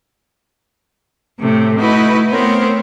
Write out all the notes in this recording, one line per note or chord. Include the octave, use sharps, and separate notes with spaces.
A2 C3 A3
A3 D#4 E4 F#4 B4
A3 B3 C4 A#4 C5 C#5